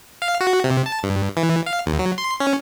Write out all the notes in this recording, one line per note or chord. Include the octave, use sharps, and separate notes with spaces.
F5
F#4
C3
A5
G2
E3
F5
D#2
F#3
C6
C#4